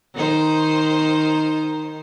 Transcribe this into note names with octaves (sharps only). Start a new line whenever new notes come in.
D#3 D#4 C5